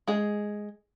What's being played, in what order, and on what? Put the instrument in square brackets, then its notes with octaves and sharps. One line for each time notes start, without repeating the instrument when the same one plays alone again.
[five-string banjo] G#3 G#4